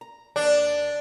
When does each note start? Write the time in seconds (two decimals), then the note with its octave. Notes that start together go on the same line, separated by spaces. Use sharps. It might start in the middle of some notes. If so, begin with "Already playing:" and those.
0.01 A#5
0.36 D#2 D4 D5